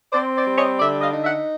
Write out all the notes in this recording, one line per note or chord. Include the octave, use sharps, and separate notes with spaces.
C4 C5 D5
C5 D5
G3
C#5 D#5
D3 D5 E5
D#5 F5
D#4
E5 F#5